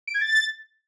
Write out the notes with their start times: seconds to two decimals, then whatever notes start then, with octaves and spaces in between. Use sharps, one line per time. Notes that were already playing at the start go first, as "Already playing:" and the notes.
0.07 D7
0.14 G#6
0.21 A6